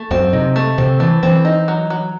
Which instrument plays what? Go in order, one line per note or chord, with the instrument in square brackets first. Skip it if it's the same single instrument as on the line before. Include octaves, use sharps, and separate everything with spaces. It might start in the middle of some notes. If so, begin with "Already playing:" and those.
Already playing: [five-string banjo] A3
[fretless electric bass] F#2 [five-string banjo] C4
[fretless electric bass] C3 [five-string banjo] D#4
[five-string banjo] A3
[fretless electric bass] C3 [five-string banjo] C4
[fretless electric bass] E3 [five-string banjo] A3
[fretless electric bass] E3 [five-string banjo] C4
[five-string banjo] D#4
F#3
F#3